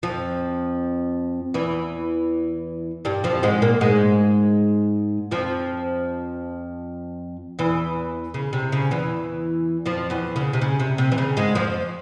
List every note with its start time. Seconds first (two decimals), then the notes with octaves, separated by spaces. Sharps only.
0.03 F2 F3
1.54 E2 E3
3.05 G2 G3
3.24 F2 F3
3.43 G#2 G#3
3.62 A#2 A#3
3.81 G#2 G#3
5.31 F2 F3
7.59 E2 E3
8.34 C#3
8.53 C3
8.72 C#3
8.91 E2 E3
9.86 F2 F3
10.10 E2 E3
10.36 C#3
10.53 C3
10.61 C#3
10.80 C3
10.98 C3
11.12 E3
11.18 C#3
11.37 G#2 G#3
11.55 F2 F3